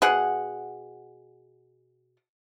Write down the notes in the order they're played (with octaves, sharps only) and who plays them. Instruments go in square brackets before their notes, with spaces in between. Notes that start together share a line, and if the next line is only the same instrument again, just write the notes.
[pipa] B2 G#4 F#5